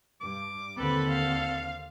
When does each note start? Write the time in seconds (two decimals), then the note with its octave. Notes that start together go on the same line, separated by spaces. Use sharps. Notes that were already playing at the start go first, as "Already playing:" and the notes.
0.21 G2 D6
0.78 D#2 D3 C4 A4 B4
1.09 F5